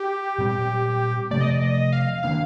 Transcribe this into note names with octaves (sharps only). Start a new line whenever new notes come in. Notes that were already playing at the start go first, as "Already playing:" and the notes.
Already playing: G4
A#2 G3 C4
C3 F3 A3 D5
D#5
D5
D#5
F5
D#3 A#3 D4 F5